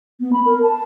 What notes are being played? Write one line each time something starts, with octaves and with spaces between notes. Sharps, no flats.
B3
B5
A#4
A5